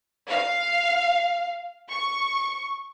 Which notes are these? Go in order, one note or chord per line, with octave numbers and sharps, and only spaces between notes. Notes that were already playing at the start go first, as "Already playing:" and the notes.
F5
C#6